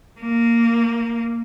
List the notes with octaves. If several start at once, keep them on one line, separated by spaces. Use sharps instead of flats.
A#3